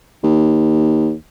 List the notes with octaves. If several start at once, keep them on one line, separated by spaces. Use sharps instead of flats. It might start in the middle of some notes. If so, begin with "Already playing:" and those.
D#2